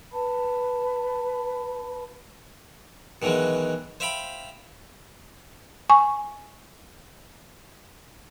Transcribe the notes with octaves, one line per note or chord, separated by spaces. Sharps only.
B4 A5 B5
B2 D#3 E3 F#3 G#3
C5 E5 F5 G5 B5
G#5 C#6